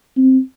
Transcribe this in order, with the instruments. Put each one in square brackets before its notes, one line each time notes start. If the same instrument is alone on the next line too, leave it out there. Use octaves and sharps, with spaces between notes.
[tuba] C4